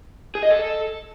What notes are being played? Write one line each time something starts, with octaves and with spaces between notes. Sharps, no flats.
G#4
D#5
A4